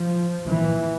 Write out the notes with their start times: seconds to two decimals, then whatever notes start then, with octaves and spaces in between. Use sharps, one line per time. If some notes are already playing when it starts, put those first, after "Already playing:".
Already playing: F3
0.47 A#2 E3